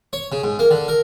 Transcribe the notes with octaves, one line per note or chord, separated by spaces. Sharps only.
C#5
C#3
G#2
A#3
D3
A#4